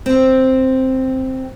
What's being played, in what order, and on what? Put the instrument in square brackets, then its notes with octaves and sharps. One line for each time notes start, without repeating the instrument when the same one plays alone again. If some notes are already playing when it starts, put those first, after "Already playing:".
[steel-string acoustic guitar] C4